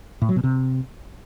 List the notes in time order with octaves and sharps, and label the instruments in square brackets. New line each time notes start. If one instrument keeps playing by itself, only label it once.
[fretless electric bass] A2
F#3
B2
C3